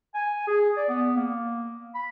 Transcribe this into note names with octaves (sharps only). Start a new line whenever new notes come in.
G#5
G#4
D5
B3
A#3
B5